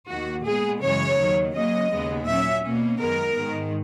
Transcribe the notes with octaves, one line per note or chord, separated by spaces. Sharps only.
D#2 D#3 A#3 F#4
A#2 G#3 B3 G#4
F#2 C#3 E3 G#3 C#5
D#2 D#3 F#3
C#3 F#3 A#3 C#4 D#5
D#2 C#3 G#3 B3
A#2 F#3 C#4 E5
B2 A#3 C#4
F#2 D#3 G#3 B3 A#4
G#2 D#3 G#3